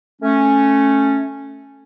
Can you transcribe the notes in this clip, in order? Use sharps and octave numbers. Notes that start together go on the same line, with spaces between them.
A3 C#4